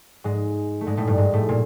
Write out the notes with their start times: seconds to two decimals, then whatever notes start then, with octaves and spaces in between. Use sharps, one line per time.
0.24 G#2 G#3
0.81 A3
0.86 G#2 G#3
0.97 A2 A3
1.07 G2 G3
1.18 G#2 G#3
1.33 A2 A3
1.49 A#2 A#3